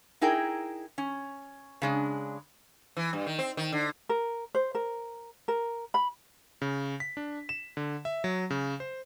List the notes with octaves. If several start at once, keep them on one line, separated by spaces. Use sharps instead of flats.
D#4 E4 G#4 A#4 G5
C#4
C#3 G#3 D4
E3
G2
D#3
C4
D#3
D3
A#4
C5
A#4
A#4
B5
C#3
B6
D4
E7
D3
E5
F#3
C#3
C5